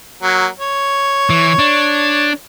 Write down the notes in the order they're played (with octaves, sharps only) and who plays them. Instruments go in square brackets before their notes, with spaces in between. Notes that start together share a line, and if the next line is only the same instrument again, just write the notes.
[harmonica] F#3 A#3
C#5
[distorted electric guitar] E3
D4